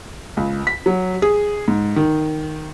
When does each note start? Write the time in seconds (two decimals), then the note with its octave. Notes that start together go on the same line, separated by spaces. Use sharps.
0.37 C#2
0.67 B6
0.86 F#3
1.22 G#4
1.68 G#2
1.96 D#3